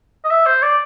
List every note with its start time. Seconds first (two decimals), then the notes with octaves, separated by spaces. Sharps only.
0.25 D#5
0.31 E5
0.46 C5
0.63 D5